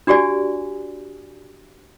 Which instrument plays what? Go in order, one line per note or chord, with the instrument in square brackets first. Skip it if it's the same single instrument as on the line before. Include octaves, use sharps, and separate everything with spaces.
[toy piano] D4 F#4 G4 D5 G#5